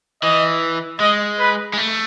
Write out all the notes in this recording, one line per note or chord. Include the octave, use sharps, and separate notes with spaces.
E3 D#5
G#3 D#5
B4
G#3
A3